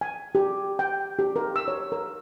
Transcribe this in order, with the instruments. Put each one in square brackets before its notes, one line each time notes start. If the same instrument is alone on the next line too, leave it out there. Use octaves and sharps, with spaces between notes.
[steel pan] G#5
G4
G5
G4
A#4
E6
C#5
A#4